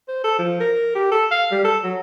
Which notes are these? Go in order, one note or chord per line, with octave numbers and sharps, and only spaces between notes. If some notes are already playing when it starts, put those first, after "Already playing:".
C5
A4
F3
A#4
G4
A4
F5
G3
A4
F#3